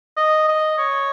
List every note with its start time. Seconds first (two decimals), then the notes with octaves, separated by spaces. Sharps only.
0.17 D#5
0.48 D#5
0.78 C#5